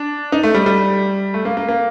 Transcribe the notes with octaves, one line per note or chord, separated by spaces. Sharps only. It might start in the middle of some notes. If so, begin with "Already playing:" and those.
Already playing: D4
D#4
A3
G3
G3
A3
A#3
A#3
A#3